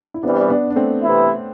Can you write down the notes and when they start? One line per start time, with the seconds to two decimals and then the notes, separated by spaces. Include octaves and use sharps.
0.14 E4
0.23 C3 E3 G3 B3 D4
0.49 B3 D4
0.70 D4
0.76 A3 C4
1.02 C3 E3 B3 E4